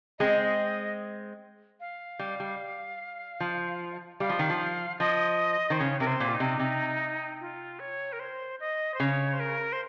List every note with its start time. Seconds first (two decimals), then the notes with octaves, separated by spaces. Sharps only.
0.19 G#3 C4 D#5
1.80 F5
2.19 G3
2.40 G3
3.40 F3
4.20 G3 F5
4.29 F3
4.39 D#3
4.50 F3
5.00 F3 D#5
5.70 D#3 C5
5.79 C#3 C#5
6.00 C3 A#4
6.07 C5
6.20 A#2
6.29 F4
6.34 D#4
6.40 C3
6.59 C3
7.41 F4
7.80 C#5
8.13 A#4
8.20 C5
8.60 D#5
8.94 C5
9.00 C#3 C#5
9.33 C5
9.40 A#4
9.73 C5